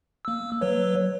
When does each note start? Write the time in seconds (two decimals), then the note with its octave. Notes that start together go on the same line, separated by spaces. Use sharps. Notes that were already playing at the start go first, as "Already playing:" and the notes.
0.25 A#3 E6
0.61 F#3 B4 C#5